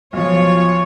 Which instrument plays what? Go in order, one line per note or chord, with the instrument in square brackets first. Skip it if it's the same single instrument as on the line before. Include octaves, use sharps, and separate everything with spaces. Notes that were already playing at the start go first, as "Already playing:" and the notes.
[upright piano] B1 F3 [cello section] F4 C#5